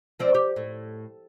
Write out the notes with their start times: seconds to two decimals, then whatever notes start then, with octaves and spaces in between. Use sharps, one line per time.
0.19 F3 C4 D5
0.35 G4
0.56 A2